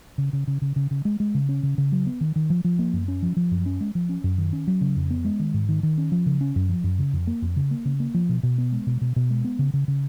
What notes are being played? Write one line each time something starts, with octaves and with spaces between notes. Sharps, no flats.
C#3
C#3
C#3
C#3
C#3
C#3
G#3
G#3
C#3
C#4
C#3
C#3
F#3
B3
D#3
D#3
F3
F3
A#3
F#2
C#4
F3
F3
F#2
C#4
G#3
F3
C#4
F#2
D#3
C#4
F#3
C#3
F2
B3
G#3
D#3
G#2
D#3
D#3
C#4
F3
C#3
C#4
F#2
F3
F#2
C#3
F2
A#3
F2
C#3
A#3
C#3
A#3
F3
B2
B2
B3
G#3
B2
B2
B2
G#3
B3
C#3
C#3
C#3